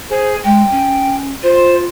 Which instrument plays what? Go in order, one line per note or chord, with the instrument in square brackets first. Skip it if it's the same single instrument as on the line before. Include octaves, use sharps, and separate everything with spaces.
[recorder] G#4 [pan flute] C5
[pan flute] G#3 [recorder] G5
[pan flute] C#4
[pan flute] F4 [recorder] C5